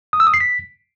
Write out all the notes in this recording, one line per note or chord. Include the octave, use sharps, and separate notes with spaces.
D#6
E6
D#6
C7
B6